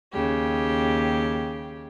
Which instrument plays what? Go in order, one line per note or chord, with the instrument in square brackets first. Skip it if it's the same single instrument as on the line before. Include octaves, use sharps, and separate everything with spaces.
[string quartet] D#2 C#3 G4